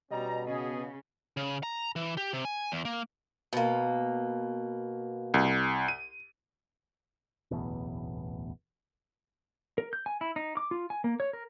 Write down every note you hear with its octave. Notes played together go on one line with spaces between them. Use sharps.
B2 G3 C#4 D#5 A#5
C#3 G#4
C#3
A#5
E3
G4
C3
G#5
E2
A#3
B2 A#3
C2
D#7
D1 A1 E2 B2
A#4
G6
G#5
E4
D#4
D6
F4
G#5
A#3
C#5
A#4